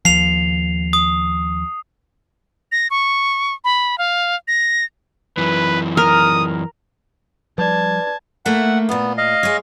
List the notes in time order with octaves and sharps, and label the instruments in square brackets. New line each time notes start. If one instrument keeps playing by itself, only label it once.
[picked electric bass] D#2 F3 [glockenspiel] C7 F7
[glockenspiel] D#6
[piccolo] A#6
C#6
B5
F5
A#6
[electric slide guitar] F#2 E3 [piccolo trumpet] B4
[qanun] A#4 [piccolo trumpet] D#6
[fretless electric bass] F3 G3 [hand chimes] B4 D5 [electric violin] A5 G#6
[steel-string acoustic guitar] A3 A#3 E4 [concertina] F#5
[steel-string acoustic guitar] A#2 F4 [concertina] B3
[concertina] D#5 F5
[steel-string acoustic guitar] G#3 C#5